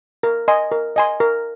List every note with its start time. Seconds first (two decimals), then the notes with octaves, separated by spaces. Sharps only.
0.23 A#4
0.48 D#5 G#5 C6
0.72 A#4
0.96 D#5 G#5 C6
1.20 A#4